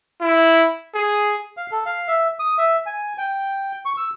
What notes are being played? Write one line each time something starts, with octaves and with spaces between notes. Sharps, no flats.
E4
G#4
F5
A4
F5
E5
D#6
E5
G#5
G5
C#6
E6